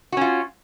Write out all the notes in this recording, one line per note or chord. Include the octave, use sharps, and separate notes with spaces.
C#4 F4 F#4